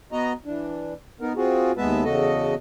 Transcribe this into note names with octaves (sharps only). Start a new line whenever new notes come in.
B3 F#4 D#5 A#5
E3 D4
B3 D#4 A#4
C4 F4 F#4 G#4
D#2 G#3 B3 B4 E5 A5
E2 C#3 F#4 A4 D#5